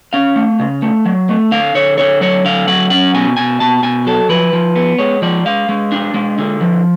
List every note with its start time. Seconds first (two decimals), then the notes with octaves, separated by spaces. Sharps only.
0.13 C#4 F5
0.36 A3
0.60 C#3
0.82 A3
1.05 F#3
1.29 A3
1.52 D3 F5
1.75 D3 C#5
1.98 D3 C#5
2.21 F#3 C#5
2.45 D3 F5
2.68 F#3 F#5
2.90 C#4 F#5
3.14 B2 G#5
3.37 B2 G#5
3.60 B2 A5
3.83 B2 G#5
4.06 F#3 A4
4.29 F3 B4
4.53 F3
4.75 B3
4.98 G#3 C#5
5.22 F3 D5
5.46 G#3 F5
5.69 G#3
5.92 D4
6.14 G#3
6.38 D3
6.61 F3